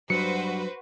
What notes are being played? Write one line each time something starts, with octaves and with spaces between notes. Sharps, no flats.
G2 F#3 F#4 B4 C5 C#7